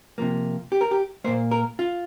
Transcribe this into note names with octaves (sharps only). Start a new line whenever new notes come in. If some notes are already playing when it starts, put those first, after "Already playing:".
C3 F3 A#3
G4
A#4
G4
A#2 A#3 C5
A#4
F4